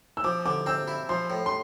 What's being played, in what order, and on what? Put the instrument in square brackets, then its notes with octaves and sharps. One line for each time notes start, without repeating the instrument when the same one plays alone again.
[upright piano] E6
[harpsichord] F3 [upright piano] D6
[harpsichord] D3 [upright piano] D6
[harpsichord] C4 [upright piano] E6
[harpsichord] E4
[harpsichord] F3 [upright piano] C6
[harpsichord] A2
[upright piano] C6